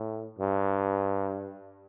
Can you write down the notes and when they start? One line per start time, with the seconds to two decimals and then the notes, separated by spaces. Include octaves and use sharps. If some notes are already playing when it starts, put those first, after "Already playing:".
Already playing: A2
0.38 G2